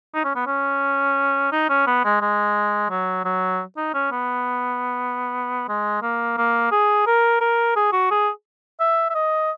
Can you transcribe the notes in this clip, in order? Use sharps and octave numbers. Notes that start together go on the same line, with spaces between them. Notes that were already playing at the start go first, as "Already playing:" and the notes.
D#4
C#4
B3
C#4
D#4
C#4
B3
G#3
G#3
F#3
F#3
D#4
C#4
B3
G#3
A#3
A#3
G#4
A#4
A#4
G#4
F#4
G#4
E5
E5
D#5